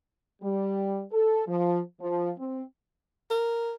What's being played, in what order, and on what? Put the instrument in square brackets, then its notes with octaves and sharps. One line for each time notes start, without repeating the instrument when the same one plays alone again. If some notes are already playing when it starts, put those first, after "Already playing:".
[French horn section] G3
A4
F3
F3
C4
[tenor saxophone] A#4